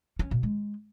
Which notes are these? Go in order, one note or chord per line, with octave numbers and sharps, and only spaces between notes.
C#4
B2
G#3